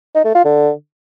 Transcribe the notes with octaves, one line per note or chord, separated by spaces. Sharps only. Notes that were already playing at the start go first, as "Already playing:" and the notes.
D#4
A3
F4
D3